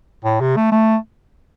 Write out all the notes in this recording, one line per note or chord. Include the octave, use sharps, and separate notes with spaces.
A2
C3
A3
A3